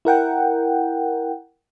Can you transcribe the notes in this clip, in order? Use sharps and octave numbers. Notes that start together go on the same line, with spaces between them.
E4 A#4 F#5 G5